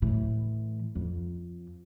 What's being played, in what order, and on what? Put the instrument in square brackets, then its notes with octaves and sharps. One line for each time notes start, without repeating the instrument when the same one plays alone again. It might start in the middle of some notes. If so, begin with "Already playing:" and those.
[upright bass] A2 E3
F2